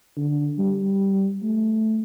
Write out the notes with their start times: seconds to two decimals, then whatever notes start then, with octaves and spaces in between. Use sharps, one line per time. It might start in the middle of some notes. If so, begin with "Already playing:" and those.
0.17 D3
0.59 G3
1.43 A3